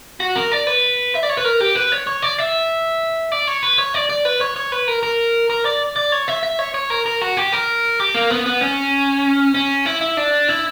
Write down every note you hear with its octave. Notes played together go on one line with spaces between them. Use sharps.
F#4
A#4
D5
B4
E5
D5
C#5
B4
A#4
G4
B4
C#5
C#5
D5
E5
D5
C#5
B4
C#5
D5
D5
B4
C#5
C#5
B4
A#4
A#4
A#4
D5
D5
C#5
E5
E5
C#5
C#5
A#4
A#4
F#4
G4
A#4
G4
A#3
B3
B3
C#4
C#4
E4
E4
D4
E4